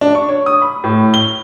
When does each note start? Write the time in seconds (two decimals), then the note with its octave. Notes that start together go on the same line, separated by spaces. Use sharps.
0.01 D4
0.15 C#6
0.29 C#5
0.46 D#6
0.62 B5
0.84 A2
1.14 G7